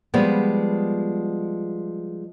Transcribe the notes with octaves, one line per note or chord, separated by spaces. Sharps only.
F3 G3 G#3 B3